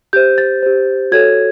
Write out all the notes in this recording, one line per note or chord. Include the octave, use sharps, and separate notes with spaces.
G4 C5 G6
A6
G4 C5
F#4 A4 C#5 G#6